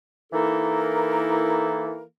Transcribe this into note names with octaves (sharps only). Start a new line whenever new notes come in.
E3 A#3 D#4 E4 A4 A#4